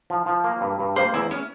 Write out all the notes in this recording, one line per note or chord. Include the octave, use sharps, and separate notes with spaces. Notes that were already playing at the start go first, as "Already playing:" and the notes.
F3
F3
A#3
G2
G2
A#3 C5
E2 E4
C#4